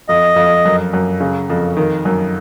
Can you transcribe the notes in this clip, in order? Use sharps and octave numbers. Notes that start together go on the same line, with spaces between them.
F2 D#5
F2
F#2
F#2
C#3
F2
D#3
F#2